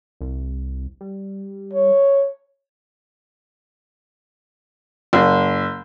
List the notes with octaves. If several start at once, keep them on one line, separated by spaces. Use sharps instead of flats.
C2
G3
C#5
F#1